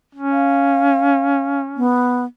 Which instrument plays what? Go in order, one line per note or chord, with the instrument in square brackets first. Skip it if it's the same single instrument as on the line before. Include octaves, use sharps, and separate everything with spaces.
[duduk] C#4
[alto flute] F5
B3